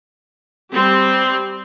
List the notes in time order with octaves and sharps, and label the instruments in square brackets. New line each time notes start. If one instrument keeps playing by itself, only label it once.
[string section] G3 C4